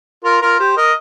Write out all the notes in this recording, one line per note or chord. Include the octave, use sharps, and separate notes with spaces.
F4 A#4
F4 A#4
G4 C5
A#4 D#5